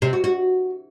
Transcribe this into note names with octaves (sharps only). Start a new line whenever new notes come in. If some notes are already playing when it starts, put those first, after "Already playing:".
C3
F#4
F#4